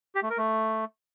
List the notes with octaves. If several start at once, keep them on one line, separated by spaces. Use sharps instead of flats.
G4
A3
A#4
A3